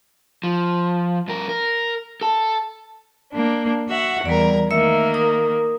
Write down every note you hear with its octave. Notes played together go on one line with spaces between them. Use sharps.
F3
G2 A#4
A#4
A4 A5
A#3 D4
F#4 E5 F#5
E2 G3 A#4 D5
D#3 A3 A#3 E5 E6
A#4 D#6